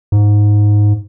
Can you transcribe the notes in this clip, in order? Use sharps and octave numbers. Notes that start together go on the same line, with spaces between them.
G#2